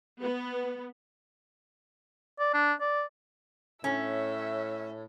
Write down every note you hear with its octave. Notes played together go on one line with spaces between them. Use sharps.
B3
D5
D4
D5
A2 C#4 E5